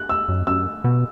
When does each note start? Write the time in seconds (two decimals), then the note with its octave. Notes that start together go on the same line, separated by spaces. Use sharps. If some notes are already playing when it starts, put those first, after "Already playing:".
Already playing: F#6
0.09 E6
0.28 F#2
0.47 F#2 E6
0.84 B2